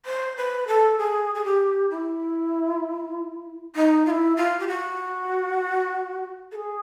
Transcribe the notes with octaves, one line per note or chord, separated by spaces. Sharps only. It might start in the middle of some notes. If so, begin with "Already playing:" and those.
C5
B4
A4
G#4
G#4
G4
E4
D#4
F4
E4
F4
G4
F#4
A4
G#4